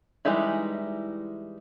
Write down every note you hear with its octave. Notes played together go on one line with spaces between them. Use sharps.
E3 G3 G#3 D#4 E4